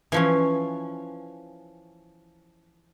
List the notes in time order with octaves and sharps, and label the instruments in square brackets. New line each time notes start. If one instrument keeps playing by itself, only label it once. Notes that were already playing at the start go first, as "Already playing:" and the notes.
[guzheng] E3 F3 C#4